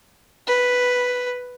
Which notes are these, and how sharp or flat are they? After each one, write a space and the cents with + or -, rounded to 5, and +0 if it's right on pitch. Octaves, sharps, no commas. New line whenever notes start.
B4 +0